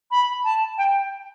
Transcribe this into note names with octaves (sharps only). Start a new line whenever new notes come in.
B5
A5
G5